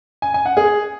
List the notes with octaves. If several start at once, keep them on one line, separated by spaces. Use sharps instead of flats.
G#5
G#5
F#5
G#4